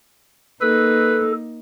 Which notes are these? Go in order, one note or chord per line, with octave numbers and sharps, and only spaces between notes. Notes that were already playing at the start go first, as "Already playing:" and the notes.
A#3 D#4 A4 B4